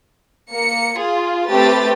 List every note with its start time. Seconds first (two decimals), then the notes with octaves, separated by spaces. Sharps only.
0.51 A#3 C#7
0.98 F4 G#4
1.50 A3 C4 G4 B4 A6